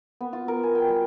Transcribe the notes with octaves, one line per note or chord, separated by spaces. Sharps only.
B3
F4
A#4
G#5
G5
G3